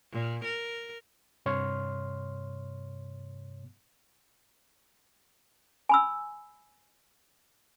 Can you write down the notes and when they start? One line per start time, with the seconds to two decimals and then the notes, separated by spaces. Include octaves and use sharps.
0.12 A#2
0.45 A#4
1.46 G2 C3 C#5 C6 F6
5.89 G#5 B5 E6